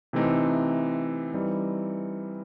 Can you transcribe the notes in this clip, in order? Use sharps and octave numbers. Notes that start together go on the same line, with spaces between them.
C3 E3 A3 C4 D#4
E3 G3 C4 D#4